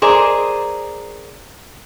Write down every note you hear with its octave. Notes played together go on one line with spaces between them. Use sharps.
G#4 A#4 C5 D5 D#5